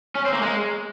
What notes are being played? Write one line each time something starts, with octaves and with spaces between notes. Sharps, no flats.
C#4
C4
A#3
G#3